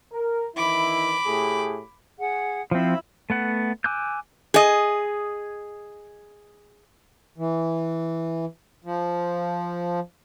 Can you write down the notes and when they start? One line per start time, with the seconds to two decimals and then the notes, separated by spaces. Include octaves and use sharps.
0.12 A#4
0.57 D#3 E3 E4 B5 D6
1.27 A2 G4 G#4
2.19 G#4 F#5
2.71 F3 C4 E4 E5 B5
3.30 A3 B3 F#5
3.84 G#5 D6 E6 F#6 G6
4.54 G#4 D#5
7.38 E3
8.84 F3